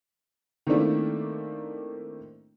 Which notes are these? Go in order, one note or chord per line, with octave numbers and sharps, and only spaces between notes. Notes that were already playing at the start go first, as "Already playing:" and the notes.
D#3 A3 A#3 C4 D4 E4